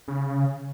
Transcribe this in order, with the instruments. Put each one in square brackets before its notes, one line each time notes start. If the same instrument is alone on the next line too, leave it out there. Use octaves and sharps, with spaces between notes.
[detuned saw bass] C#3